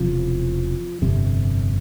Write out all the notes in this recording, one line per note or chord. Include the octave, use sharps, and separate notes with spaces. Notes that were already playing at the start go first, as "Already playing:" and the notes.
Already playing: E1 E2 C3 F3
G1 F2 C3